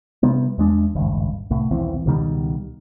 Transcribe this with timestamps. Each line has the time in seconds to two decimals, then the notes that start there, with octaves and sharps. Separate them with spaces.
0.23 C3 G3 B3
0.58 E2 G#3 D4
0.95 D#1 G#1 C#2 G2
1.50 C2 A2
1.71 D#1 B1 E3 C4
2.06 C#2 B2 D#3 G3